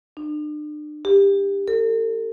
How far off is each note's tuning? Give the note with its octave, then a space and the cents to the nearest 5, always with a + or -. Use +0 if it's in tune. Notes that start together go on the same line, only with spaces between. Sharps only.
D4 +40
G4 +20
A4 +45